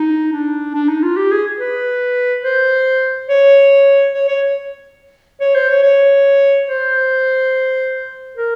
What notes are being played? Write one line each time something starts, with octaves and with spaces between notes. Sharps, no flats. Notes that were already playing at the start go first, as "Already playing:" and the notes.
Already playing: D#4
D4
D4
D#4
F4
G4
G#4
B4
C5
C#5
C#5
C#5
C#5
C5
C#5
C#5
C5
A#4